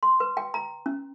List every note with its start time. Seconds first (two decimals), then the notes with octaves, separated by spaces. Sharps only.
0.03 C6
0.20 B4
0.37 G5
0.54 A#5
0.86 C#4